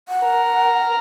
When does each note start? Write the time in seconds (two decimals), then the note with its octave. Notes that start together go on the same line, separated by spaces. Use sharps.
0.09 F#5
0.23 A#4